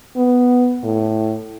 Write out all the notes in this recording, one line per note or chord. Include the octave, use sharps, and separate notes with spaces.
B3
A2